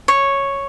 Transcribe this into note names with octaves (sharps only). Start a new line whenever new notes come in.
C#5